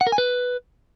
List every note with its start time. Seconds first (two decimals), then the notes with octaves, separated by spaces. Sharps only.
0.01 F#5
0.07 A#4
0.12 G#5
0.18 B4